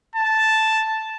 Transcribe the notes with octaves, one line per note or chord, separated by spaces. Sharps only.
A5